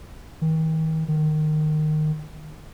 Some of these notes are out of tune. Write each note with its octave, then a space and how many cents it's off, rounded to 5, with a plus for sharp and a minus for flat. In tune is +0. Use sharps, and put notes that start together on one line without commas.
D#3 +40
D#3 -20